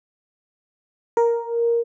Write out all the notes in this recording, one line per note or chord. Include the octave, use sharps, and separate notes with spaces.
A#4